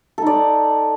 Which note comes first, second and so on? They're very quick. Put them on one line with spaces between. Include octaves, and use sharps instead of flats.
A4 D#4 D5